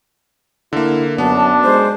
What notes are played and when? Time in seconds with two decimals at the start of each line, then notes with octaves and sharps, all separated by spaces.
0.73 D3 A#3 E4
1.18 F#2 B3 D4 A5
1.64 G#3 C5